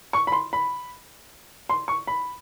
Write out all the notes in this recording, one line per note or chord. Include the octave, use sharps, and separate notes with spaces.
C#6
B5
C6
B5
C6
C#6
B5